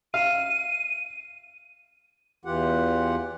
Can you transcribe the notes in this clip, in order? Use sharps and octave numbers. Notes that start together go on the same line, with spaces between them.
F5 D#7
E2 E3 F4 G4 F#5